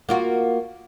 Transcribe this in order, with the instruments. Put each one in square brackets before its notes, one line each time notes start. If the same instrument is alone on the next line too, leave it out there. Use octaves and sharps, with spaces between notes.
[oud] A#3 F4 F#4